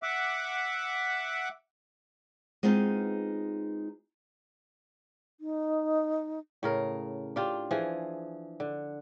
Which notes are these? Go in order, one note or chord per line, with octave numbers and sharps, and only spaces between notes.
E5 F#5 D6
G#3 B3 C4 D#4 F4
D#4
A2 C#3 A#4
D4 F4 G4
E3 F3 G#4
D3